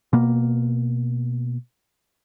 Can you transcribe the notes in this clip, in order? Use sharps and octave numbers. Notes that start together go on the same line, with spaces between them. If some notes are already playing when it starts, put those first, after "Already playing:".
B2 A#3